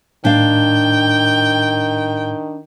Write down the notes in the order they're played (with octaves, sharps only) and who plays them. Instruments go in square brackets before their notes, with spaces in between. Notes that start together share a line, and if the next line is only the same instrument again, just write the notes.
[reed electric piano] A2 [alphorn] D#3 [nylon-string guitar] D4 F5 [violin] G5